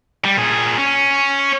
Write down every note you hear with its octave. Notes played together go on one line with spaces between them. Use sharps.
G3
A#2 G#4
C#4